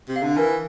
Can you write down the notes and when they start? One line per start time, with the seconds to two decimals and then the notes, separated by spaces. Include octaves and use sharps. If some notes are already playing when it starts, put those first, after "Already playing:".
0.08 C3
0.16 F5
0.23 D3
0.37 E3 A#4